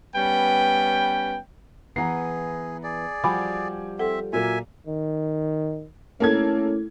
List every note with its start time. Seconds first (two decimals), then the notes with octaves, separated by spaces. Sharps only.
0.16 G3 B3 C#4 B4 G5
1.96 E3 B3 G#4 F#5 A#5 C7
2.83 G#4 D5
3.24 F3 G3 F#4 G5 G#5 B5 D6
3.99 C4 A4 E5 F#5
4.33 A#2 F#3 A#3 E5 G#5
4.87 D#3
6.20 A3 A#3 C#4 E4 A4 D6 G#6